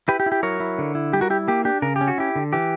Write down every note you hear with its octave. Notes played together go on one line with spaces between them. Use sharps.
E4 G4 B4
G4
E4
G4
F#3 A#4 C#5
E4
D3
E4
G3 G4
F#4 A#4
E4 G4
A#3 G4
D4 G4
C#3 A#4
G4
C#4
F#4
E4 G4
D3
E3 G4